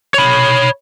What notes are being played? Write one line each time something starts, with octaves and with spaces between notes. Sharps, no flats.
C#5 B5